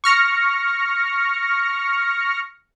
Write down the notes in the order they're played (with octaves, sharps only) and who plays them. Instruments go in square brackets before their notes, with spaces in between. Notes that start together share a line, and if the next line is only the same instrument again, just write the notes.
[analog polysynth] C#6 F6 A#6 C#7